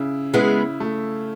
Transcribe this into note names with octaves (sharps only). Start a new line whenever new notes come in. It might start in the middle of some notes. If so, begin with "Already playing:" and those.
Already playing: C#3 E4
G#3 B3 E4
A3